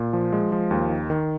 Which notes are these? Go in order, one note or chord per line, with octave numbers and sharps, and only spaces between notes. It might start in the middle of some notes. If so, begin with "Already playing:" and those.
Already playing: A#2
F3
G#3
F3
D#2
D#3
D#3